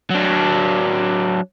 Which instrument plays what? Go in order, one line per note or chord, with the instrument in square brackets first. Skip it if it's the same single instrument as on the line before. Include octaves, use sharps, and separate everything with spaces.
[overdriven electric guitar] F#3 D4